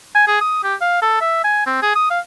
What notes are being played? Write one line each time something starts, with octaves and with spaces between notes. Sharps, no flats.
G#5
G#4
D#6
G4
F5
A4
E5
G#5
C4
G#4
D#6
F5